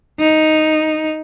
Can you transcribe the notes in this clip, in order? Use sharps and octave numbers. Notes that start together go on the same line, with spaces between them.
D#4